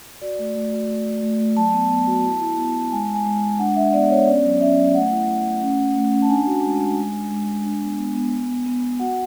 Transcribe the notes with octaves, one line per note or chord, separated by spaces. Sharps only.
F#4 D5
A3
A3
F#4
A3
A3
A3
A3
F#3 A5
B3
B3
F#4
E4
E4
B3
E4
G#3 G#5
G#3
G#5
G#3
G#5
G#3
D4 F#5
D4 E5
B3 D5
B3 C#5
C#4 D5
F#3
C#4 E5
F#3
A3 F#5
E4
E4
A3
C#4
C#4
A3
C#4
A5
D4 G#5
F#4
G#3
G#3
G#3
D4
G#3
G#3
D4
B3
B3
B3
B3
B3
B3
B3
F#4 F#5